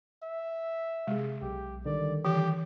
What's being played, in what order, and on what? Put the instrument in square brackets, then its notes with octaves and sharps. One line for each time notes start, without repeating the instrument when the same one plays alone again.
[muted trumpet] E5
[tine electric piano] C3 G#4 [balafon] G#3
[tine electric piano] B1 [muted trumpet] G4
[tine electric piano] D3 D#3 G3 [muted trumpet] D5
[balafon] E3 [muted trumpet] G4